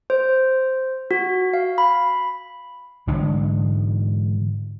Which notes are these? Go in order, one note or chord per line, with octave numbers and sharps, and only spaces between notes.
C5
F#4
F5
B5
G#2 D3 E3 G#3